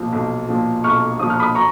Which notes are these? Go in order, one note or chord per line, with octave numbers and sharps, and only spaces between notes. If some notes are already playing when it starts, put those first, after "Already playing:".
Already playing: B1 A#2 F3
B1
A#2 F3
B1 C#6 F6
A#2 F3 D#6
F6
B5 D#6
A#5 C#6